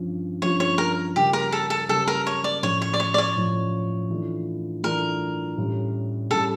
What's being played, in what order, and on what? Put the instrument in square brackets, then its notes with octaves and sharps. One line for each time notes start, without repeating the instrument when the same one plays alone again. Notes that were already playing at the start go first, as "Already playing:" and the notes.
Already playing: [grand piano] G2 F3 C#4 F4
[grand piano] G2 F3 C#4 F4 [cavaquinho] C#5
[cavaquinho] C#5
A#4
[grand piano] C#3 G3 A#3 C#4 [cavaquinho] G4
[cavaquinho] A#4
A4
A4
[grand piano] C#3 G3 A#3 C#4 [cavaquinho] A4
[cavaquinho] A#4
C#5
D5
[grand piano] A2 F3 C#4 [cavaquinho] C#5
[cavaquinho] C#5
D5
C#5
D5
C#5
[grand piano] A2 F3 C#4
E3 A3 D4 F4
[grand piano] E3 A3 D4 F4 [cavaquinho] A#4
[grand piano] A2 G3 C#4
[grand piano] A2 G3 C#4 [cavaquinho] A4